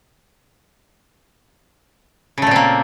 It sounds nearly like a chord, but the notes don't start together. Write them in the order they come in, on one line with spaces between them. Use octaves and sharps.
C#3 A3 A#2 C4 A#3